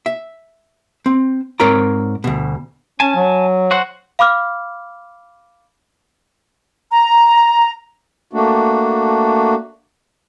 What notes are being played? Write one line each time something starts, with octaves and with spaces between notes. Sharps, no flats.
E5
C4
G#2 C4 A#4 C#5 D5 A#5
D2 B2
C#4 G#5 A5
F#3
F#4 C5 F#5
F5 B5 D6 F6
A#5
A3 A#3 D4 F#4